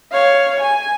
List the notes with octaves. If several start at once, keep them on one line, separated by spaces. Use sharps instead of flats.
C#5 F5
G#5